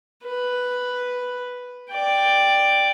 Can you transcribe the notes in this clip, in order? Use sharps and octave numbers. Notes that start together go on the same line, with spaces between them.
B4
D5 G5